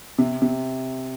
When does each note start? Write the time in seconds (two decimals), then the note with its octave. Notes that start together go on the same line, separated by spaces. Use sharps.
0.18 C3
0.42 C3